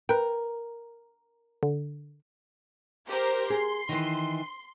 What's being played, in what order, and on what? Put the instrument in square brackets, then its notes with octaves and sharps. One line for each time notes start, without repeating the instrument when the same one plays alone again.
[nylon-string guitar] A#4 [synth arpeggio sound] B4 G5
[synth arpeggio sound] D3
[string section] G4 A#4 C5
[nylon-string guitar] G#4 [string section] C6
[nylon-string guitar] D#3 E3